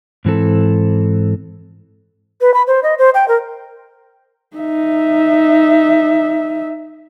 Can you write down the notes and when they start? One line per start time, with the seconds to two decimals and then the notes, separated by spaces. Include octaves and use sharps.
0.25 G#2 E3 C4 A4
2.41 B4
2.54 B5
2.67 C5
2.83 D#5
2.98 C5
3.14 G5
3.28 A#4
4.57 D#4 E5